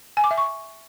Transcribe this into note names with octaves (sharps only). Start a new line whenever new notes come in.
G#5
D6
E5
C#6